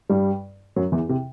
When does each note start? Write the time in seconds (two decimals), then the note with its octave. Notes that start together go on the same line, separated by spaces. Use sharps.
0.09 G2 G3
0.76 F#2 F#3
0.92 E2 E3
1.09 C3